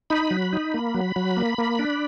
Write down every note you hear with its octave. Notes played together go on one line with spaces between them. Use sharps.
D#4 B5
F#3
D#4
A#3
F#3
F#3
A#3
A#3
D4